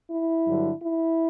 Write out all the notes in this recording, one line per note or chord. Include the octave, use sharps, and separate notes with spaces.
E4
G2 D3 F#3
E4